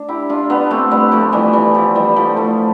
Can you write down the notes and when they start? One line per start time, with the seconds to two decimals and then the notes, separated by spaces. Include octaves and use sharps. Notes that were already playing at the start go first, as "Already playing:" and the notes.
Already playing: D4
0.08 E4 G4
0.29 D4 F4
0.50 B3 D4
0.71 A3 C4
0.91 G3 B3
1.12 F3 A3
1.32 E3 G3
1.53 E3 G3
1.75 F3
1.95 E3 G3
2.16 F3 A3
2.36 F3 A3